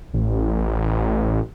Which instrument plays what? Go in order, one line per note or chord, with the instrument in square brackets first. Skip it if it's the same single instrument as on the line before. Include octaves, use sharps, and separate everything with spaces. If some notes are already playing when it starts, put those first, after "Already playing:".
[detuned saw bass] A1